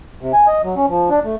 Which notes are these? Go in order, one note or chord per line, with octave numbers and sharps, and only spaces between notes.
C3
G#5
D#5
F#3
C#4
F3
D4
A3